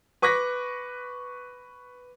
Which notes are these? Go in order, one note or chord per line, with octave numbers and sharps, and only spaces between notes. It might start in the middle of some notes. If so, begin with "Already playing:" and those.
B4 C#6 D6 F#6 A#6 B6